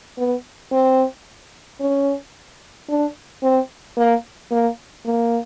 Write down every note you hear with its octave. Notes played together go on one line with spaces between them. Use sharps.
B3
C4
C#4
D4
C4
A#3
A#3
A#3